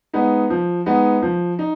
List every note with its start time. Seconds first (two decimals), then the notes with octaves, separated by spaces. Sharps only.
0.13 G#3 B3 D#4
0.50 F3
0.86 G#3 B3 D#4
1.22 F3
1.59 D#4